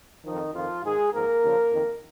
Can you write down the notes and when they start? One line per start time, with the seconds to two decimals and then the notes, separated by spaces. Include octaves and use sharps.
0.24 F2 D#3 F3 D#4
0.54 F2 D#3 F3 F4
0.83 G#2 D#3 G#3 G#4
1.12 G#2 F3 A#3 A#4
1.42 D#2 C#3 F3
1.71 F2 D#3